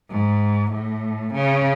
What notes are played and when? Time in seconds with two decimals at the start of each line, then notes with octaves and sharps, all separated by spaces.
0.11 G#2
0.71 A2
1.34 C#3